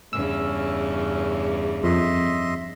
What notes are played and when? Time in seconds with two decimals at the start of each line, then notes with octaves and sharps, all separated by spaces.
0.13 E2 G2 C#3 C#4 E6
1.83 F2 D#5 E5 C6